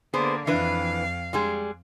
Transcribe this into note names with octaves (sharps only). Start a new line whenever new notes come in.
D3 A#3 B3 G#4 C5
F2 E3 D4 B4 F5
G3 G#3 G#4